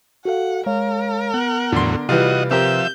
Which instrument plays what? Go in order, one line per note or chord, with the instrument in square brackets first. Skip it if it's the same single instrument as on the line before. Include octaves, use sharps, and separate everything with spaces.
[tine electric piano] F#4 A4 F5 [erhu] F#5
[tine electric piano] G#3 C#5 F5 [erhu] A#4
[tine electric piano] B3 [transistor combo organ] F#5
[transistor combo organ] E2 A2 F#3 [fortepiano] D3 C6
[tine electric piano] C3 B4 [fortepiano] E3 G3 F4 [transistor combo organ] F#4 D#5
[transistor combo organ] F3 E5 [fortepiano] C4 G4 A#4 [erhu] G6